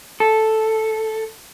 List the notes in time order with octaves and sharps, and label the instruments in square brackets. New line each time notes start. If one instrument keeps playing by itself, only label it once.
[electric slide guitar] A4